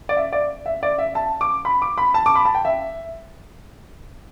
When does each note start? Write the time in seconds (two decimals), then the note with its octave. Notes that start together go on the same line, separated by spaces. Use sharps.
0.09 D5
0.17 E5
0.33 D5
0.66 E5
0.83 D5
0.99 E5
1.15 A5
1.41 D6
1.65 B5
1.82 D6
1.98 B5
2.14 A5
2.26 D6
2.35 B5
2.45 A5
2.55 G5
2.65 E5